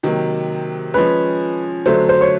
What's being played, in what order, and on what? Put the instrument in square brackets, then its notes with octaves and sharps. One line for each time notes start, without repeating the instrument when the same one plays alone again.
[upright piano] C3 D#3 F#3 A#3
[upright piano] F3 G#3 C#4 [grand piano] B4
[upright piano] D3 F#3 A3 [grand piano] C5
[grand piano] C5
C#5